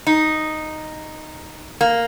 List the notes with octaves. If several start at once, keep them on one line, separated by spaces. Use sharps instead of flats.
D#4
A#3